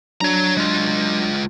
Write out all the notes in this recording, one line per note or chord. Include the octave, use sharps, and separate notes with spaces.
F#3 D4 C#5 A#5
G#3 F4